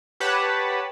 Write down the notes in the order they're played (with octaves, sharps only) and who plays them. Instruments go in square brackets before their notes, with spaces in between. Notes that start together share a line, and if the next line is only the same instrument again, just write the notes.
[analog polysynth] G4 B4 C#5 F#5 A5 B5